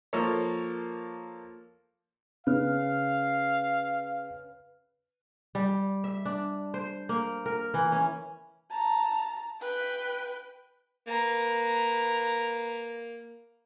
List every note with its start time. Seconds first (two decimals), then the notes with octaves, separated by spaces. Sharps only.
0.13 F3 A#3 A4 A#4 C#5
2.47 C#3 B4 F5 F6
5.55 G3
6.04 E5
6.25 D4
6.74 C5
7.09 A#3
7.46 A#4
7.74 E3
7.92 C#4
8.71 A5 A#5
9.61 B4 G5
11.07 A#3 B4 A#5